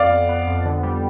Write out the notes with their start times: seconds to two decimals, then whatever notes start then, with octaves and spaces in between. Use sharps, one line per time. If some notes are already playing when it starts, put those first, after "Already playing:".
Already playing: F2 D5 F5
0.10 B3
0.29 B3
0.47 F2
0.65 D3
0.83 G3